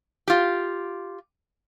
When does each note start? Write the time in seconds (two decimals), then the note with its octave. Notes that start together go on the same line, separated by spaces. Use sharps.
0.28 F4 G4